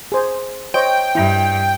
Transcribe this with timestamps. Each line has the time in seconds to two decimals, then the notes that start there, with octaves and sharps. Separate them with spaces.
0.12 G#4 C5
0.74 C5 C#5 D#5 G5
1.15 G2 E4